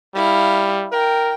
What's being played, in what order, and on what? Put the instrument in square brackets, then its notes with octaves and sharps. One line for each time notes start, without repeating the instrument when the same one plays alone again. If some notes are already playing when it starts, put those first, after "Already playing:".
[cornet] G3 [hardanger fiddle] E4 F5
[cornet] A#4 [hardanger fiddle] G5